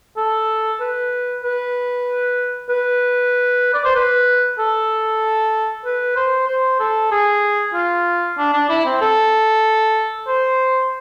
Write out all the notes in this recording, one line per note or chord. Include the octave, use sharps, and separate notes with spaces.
A4
B4
B4
B4
D5
C5
B4
A4
B4
C5
C5
A4
G#4
F4
D4
D4
E4
C4
A4
C5